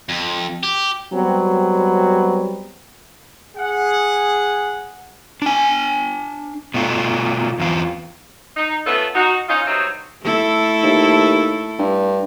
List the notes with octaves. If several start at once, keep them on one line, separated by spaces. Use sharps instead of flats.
F2
G4
F#3 G3 B3 C4
G#4 F#5
D4 G#5
B2 A3 F4
E2 F4
D#4
A3 B3 C#4 F4 A4
D#4 F#4
C#4 D#4 F4
G2 F#3 D#4 C5 C#5 E5
A3 E4 A4
D#2
G2